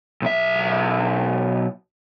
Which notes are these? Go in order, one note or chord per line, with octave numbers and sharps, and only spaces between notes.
B1 E5